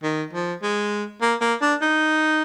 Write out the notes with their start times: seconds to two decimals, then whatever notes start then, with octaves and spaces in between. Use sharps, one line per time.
0.03 D#3
0.33 F3
0.62 G#3
1.21 A#3
1.41 A#3
1.61 D4
1.81 D#4